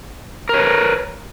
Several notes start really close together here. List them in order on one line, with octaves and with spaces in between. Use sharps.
A#4 C#5 B4